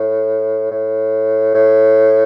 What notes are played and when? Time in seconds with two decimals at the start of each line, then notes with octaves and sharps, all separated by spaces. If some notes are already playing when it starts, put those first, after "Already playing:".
Already playing: A2
0.71 A2
1.54 A2